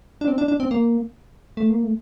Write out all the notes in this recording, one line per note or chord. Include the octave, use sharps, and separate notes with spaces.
D4
C4
D4
D4
C4
A#3
A3
A#3
A3